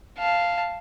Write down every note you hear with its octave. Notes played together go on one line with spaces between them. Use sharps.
F5 A5